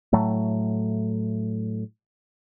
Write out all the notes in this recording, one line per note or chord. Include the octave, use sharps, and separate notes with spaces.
A2 F#3 A3